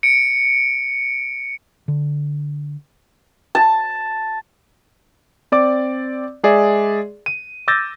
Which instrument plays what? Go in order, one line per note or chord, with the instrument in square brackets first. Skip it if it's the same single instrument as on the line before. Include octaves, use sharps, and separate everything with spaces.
[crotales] C#7 D7
[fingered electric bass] D3
[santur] A5
[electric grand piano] C4 D5 D6
G#3 G#4 D5 E5
D#7
D6 E6 G6 A6 A#6